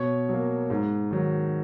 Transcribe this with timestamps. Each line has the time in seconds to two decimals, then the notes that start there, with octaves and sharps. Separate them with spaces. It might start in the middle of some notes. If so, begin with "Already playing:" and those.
Already playing: B2 C#5 C#6
0.29 F#3 A#3
0.70 G#2
1.11 D#3 F#3